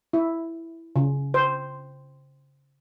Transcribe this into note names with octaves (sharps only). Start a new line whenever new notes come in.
E4
C#3
C5